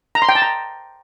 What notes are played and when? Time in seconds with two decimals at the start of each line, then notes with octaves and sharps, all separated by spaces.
0.15 A#5
0.22 C6
0.29 G5
0.35 A5
0.42 A#5